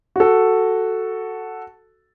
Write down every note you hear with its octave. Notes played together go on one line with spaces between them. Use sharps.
F#4 A4